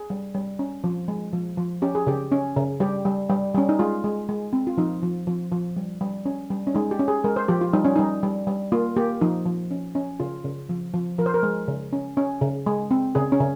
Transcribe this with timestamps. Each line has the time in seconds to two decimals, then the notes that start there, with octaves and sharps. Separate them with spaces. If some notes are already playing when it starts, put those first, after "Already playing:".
Already playing: G#4
0.10 G3
0.34 G3
0.59 C#4
0.84 F3
1.08 G#3
1.33 F3
1.58 F3
1.82 C#4 G4
1.95 G#4
2.07 C#3 G4
2.32 C#4
2.56 C#3
2.80 G3 G4
3.05 G3
3.30 G3
3.55 G3 C#4
3.69 D#4
3.79 G#3 F4
4.04 G#3
4.29 G#3
4.53 C4
4.67 F4
4.77 F3 D#4
5.03 F3
5.27 F3
5.52 F3
5.77 G3
6.01 G3
6.26 C#4
6.50 G3
6.67 C#4
6.74 G#3 D#4
6.91 G4
6.99 C#4
7.08 G#4
7.24 G#3 A#4
7.36 C5
7.48 F3 G4
7.61 F4
7.73 G3 D#4
7.85 C#4
7.96 G3 D#4
8.23 G3
8.47 G3
8.72 A#3 F4
8.96 A#3 G4
9.21 F3 D#4
9.46 F3
9.71 C#4
9.95 C#4
10.20 C#3 F4
10.45 C#3
10.69 F3
10.94 F3
11.19 F3 A#4
11.26 C5
11.34 A#4
11.43 G#3
11.68 C#3
11.93 C#4
12.17 C#4
12.41 C#3
12.66 G#3
12.91 C4
13.15 C#3 G#4
13.32 C#4
13.40 C#3